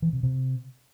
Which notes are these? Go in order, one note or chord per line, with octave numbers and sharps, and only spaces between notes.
E3
C3
C3